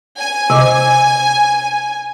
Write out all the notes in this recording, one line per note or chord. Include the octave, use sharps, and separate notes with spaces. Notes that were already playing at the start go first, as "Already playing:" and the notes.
G#5
C3 D#5 D6